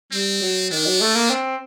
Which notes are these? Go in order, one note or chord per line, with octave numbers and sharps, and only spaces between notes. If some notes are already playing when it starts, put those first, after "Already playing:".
G3 C4
F#3
D#3 D4
F#3
A3
A#3
C4